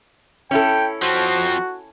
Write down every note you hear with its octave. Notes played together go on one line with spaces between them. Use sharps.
C#4 E4 A4 G5
F3 C4 F#4